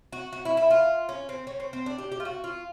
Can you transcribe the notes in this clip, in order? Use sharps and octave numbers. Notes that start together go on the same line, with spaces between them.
F#4
F#4
E4
E4
F4
C#4
C4
C#4
C4
C4
D4
G4
G4
F4
F#4
F4